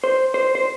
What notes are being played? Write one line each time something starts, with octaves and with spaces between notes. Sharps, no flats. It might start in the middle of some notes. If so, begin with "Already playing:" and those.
C5
C5
C5